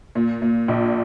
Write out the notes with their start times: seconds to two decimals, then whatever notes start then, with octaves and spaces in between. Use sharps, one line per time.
0.15 A#2
0.42 A#2
0.68 A#1